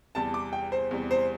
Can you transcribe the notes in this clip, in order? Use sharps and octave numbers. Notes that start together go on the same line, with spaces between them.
E2 C3 G3 A5
D6
G5
C5
E2 C3 G3
C5